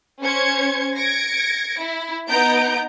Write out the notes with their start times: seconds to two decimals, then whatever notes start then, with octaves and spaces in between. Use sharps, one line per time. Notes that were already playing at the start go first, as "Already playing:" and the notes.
0.21 C#4 C5 G#6 C#7
0.97 G#6 A#6 C#7 D7
1.79 E4
2.29 B3 D#4 A#5 G6 D7